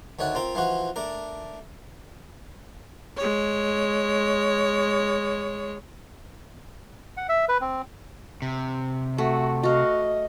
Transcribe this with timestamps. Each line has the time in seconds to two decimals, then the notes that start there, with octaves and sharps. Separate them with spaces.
0.19 D2 D#3 A3 C#5 F#5
0.35 C4 F4 A#4
0.55 E3 F3 F4 F#4
0.96 A3 D4 A#4
3.17 G#3 C#5
7.17 F#5
7.29 E5
7.48 B4
7.61 C4
8.42 C3
9.18 A3 F#4
9.63 F#4 D#5 F5